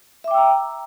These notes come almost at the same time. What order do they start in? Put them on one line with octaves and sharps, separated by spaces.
E5 D6 G5 E6 A#5